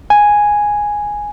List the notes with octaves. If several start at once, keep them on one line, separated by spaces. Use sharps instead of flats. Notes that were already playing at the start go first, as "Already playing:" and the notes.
G#5